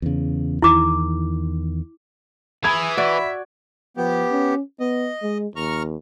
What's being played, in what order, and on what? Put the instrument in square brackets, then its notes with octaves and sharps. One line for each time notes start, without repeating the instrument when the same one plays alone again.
[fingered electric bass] E2 C#3
[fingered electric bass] E2 D#3 [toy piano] E4 D6
[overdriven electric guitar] E3 [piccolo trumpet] G#4 [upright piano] B5 G#6
[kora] F#4 D5 [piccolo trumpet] E5
[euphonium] F3 [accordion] B3 G4
[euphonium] C#4
[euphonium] B3 [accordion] D#5
[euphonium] G#3
[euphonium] D#2 [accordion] A#5 C#6 F6